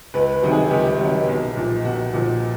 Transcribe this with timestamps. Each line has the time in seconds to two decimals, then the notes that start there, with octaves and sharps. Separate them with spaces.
0.14 C#2 B4
0.33 B4
0.43 C3 D#3 F#3
0.51 G#4
0.70 C#2 G4
1.00 C3 D#3 F#3
1.28 B1
1.57 A#2 F3
1.85 B1 F#4
2.14 A#2 F3